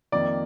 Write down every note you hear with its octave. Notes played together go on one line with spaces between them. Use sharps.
F2 D#3 A#3 D5